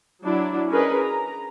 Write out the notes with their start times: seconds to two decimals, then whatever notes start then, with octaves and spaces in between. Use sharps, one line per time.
0.24 F#3 D4 E4
0.69 C#4 G#4 A#4 B4 D#5
1.00 A#5